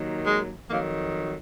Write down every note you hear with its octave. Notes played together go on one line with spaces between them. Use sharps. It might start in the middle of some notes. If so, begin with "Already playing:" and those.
Already playing: D#2 D#3 F#3
G#3
F2 D#3 F#3 A#3